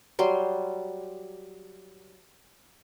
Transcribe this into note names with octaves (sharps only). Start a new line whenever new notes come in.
F#3 G3 C6